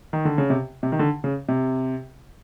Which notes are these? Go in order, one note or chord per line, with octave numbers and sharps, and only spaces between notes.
D#3
D3
C#3
C3
C3
D#3
D3
C#3
C3